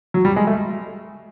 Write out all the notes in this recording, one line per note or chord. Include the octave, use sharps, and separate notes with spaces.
F#3
G3
G#3
A3